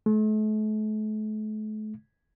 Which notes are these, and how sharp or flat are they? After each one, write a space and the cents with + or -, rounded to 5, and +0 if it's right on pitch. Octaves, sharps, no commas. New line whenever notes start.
A3 -40